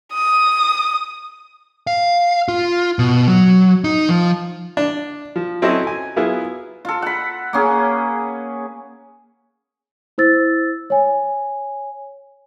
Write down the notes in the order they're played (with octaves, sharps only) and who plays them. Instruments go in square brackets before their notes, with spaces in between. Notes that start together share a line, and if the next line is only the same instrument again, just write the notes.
[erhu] D#6
[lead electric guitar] F5
F4
B2
F#3
D#4
F3
[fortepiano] D4
F3
F#3 C4 C#4 E4 A4 D#5
G#5
F#3 B3 E4 F4 G#4
[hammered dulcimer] F4 A4
F#5 B5
A#3 C#4 G#4
[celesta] E4 C5 E6 A6
C#5 G#5